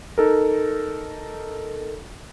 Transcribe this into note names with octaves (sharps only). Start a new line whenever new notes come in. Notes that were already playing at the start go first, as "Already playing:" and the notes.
D#4 A4 A#4